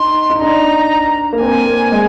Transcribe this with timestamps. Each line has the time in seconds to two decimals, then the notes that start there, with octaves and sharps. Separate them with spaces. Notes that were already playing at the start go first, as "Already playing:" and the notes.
Already playing: D#4 C6
0.30 D#4
0.41 D4 A#5
1.33 A#3
1.41 C4 G#5
1.66 A#3
1.92 G#3